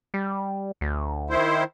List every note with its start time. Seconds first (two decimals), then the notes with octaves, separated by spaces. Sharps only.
0.14 G3
0.81 D2
1.30 D#3 E4 C5